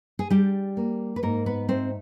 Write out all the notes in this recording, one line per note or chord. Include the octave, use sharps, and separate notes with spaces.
G#4
G3 D4 G4
A#3
B4
G#2 A#3 A#4
B3 B4
A3 C4 C5